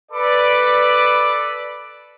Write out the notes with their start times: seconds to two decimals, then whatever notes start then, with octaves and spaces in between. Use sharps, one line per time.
0.11 A4 B4 D5 B5 D6